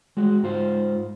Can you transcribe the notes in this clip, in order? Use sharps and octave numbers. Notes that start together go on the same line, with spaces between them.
G#3 F#4
G#2 F4 C5